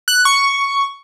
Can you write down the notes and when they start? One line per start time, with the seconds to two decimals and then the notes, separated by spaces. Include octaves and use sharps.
0.08 F#6
0.25 C#6